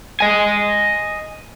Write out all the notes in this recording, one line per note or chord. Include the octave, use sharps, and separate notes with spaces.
D#5 G#5